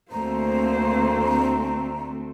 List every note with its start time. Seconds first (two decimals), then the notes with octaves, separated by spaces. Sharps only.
0.12 D2 A3 A#3 C4 C5 A#5